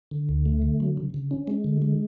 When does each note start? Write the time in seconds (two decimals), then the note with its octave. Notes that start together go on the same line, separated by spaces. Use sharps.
0.11 D3
0.29 D2
0.46 A3
0.62 D3
0.80 F#3
0.97 C#3
1.14 C#3
1.31 C#4
1.47 G#3
1.64 D3
1.82 G#3